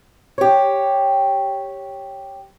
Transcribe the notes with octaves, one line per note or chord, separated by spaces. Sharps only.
G4 C#5